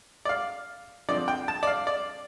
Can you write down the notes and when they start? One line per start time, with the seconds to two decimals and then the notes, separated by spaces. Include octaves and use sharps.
0.25 D5
0.29 F5
1.09 D3 F3 C4 D5
1.28 G5
1.48 A5
1.63 D5
1.67 F5
1.87 D5